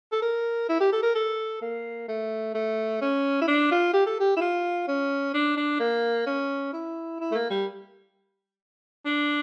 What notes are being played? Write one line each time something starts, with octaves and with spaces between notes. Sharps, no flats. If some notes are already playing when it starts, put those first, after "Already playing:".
A4
A#4
E4
G4
A4
A#4
A4
A#3
A3
A3
C#4
E4
D4
F4
G4
A4
G4
E4
F4
C#4
D4
D4
A#3
C#4
E4
E4
A3
A#3
G3
D4